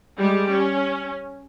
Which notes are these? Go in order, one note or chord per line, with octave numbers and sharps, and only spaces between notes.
G3 G#3 G4
C#4